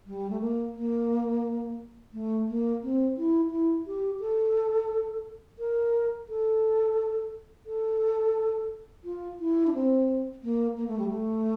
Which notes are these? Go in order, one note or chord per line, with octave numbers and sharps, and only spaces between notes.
G3
A3
A#3
A#3
A3
A#3
C4
E4
E4
G4
A4
A#4
A4
A4
F4
E4
D4
C4
A#3
A#3
A3
G3
A3